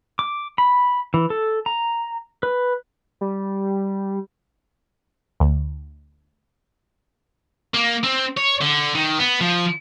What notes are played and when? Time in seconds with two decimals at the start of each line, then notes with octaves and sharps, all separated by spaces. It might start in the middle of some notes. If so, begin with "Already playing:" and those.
0.19 D6
0.58 B5
1.14 E3
1.30 A4
1.66 A#5
2.43 B4
3.21 G3
5.40 D2
7.74 A#3
8.03 C4
8.37 C#5
8.61 D3
8.95 D#3
9.19 B3
9.41 F3